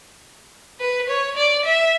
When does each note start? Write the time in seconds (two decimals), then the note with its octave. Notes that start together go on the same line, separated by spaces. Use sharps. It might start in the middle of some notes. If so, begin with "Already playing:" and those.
0.80 B4
1.09 C#5
1.37 D5
1.65 E5